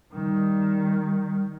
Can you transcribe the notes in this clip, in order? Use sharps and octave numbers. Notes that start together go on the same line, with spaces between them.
D#3 G3